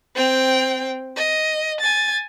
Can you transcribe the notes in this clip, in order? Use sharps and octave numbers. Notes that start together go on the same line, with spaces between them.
C4 G5
D#5
G#5 A6